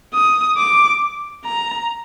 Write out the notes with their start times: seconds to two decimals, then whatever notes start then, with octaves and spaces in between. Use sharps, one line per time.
0.14 D#6
0.57 D6
1.46 A#5